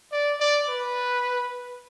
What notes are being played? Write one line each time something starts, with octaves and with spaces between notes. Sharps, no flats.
D5
D5
B4